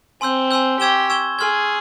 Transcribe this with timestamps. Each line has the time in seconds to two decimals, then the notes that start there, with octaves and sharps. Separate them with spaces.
0.21 C4 G#5 C6 E6 G6
0.51 G#5 C6 E6 G6
0.79 G4 C#6 E6 G#6 E7 G7
1.10 C#6 E6 G#6 E7 G7
1.39 G#4 G#5 C6 F6 G#6